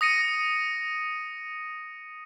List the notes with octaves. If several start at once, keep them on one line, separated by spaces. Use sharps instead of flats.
D#6 A#6 C#7 D#7